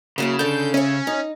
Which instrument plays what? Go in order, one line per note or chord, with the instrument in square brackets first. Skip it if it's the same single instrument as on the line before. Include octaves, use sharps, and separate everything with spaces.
[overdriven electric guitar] C#3 [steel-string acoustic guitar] F#3 A#3 E4
[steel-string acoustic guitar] D3 A4 [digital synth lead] G6
[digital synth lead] C#4 [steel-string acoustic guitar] C#5 E5
[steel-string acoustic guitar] D#4